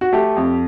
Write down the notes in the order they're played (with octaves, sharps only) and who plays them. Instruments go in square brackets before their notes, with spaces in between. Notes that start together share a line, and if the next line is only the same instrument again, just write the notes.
[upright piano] F#4
A3 G4
F2